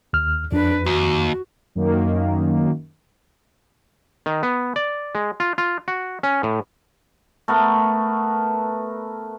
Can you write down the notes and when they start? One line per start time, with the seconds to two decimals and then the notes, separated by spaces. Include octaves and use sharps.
0.13 D#2 F6
0.52 F2 D4 B4
0.86 D#2 F#4
1.75 F#2 D#3 A#3
4.26 D#3
4.43 B3
4.76 D5
5.15 G#3
5.40 F4
5.58 F4
5.88 F#4
6.23 C#4
6.43 A2
7.48 A3 B3 A#4